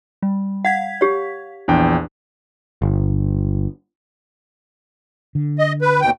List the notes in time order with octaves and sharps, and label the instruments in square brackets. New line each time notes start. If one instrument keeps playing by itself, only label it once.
[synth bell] G3
[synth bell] F5 G#6 B6 [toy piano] F#5
[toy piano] G4 C#5
[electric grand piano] A#1 E2 G5 [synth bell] D4
[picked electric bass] G1
[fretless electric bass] D3
[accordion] D#5
B4
D#2 B2 G5